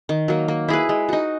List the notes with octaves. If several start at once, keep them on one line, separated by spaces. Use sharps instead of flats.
D#3
F#3 A#3
A#3
E4 G#4 B4
G#3
D#4 F#4